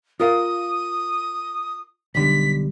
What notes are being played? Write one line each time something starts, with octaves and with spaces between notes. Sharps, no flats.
F4 A#4 F5 D#6
B1 D3 G3 B6